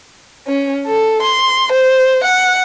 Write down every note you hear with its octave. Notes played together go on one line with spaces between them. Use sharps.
C#4
A4
C6
C5
F#5